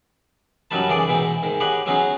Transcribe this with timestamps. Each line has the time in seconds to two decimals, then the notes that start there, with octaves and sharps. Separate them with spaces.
0.71 F#2 F#3 G3 D#4 B4 A5
0.89 D#3 E3 G#4 D5 G5 D#6
1.08 G#2 B2 E3 D#4
1.43 G#2 D#3
1.60 G4 G#4 B4 C#5 D#5 F#5
1.86 F#3 B3 C#4 D#4 F#4 G#4